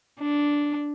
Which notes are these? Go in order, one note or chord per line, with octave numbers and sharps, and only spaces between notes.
D4